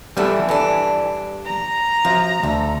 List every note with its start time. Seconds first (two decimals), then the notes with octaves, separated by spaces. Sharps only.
0.17 G2 D3 E3 G3 A3 B3 A4
0.49 G2 D4 A4 B4
1.45 A#5
2.05 F#2 F3 F4
2.43 D2 A4